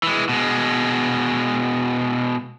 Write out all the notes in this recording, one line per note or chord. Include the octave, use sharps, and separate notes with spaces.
E3 G#3
B2 G#3